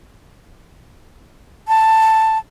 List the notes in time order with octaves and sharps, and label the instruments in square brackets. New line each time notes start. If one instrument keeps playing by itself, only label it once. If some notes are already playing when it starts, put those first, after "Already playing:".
[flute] A5